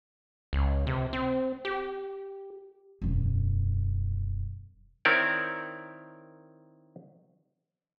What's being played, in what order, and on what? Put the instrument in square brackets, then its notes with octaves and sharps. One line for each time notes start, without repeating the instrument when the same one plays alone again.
[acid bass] C#2
C3
C4
G4
[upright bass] E1 F#2
[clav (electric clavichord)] D#3 C4 E4 A#4 C#5 D5